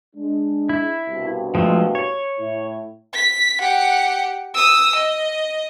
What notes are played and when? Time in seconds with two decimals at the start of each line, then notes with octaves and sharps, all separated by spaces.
0.15 G#3 D4
0.69 E4
1.06 C2 G2 B2
1.55 F3 G#3 A3
1.95 C#5
2.38 A2 E4
3.13 B6
3.61 G4 F#5
4.54 D#6 E6
4.96 D#5